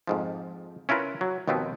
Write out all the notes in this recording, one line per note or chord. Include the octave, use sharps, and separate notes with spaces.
F2 G#2 F3
C#4 E4 F4 A#4 B4
F#3
D#2 B2 F3 B3 C4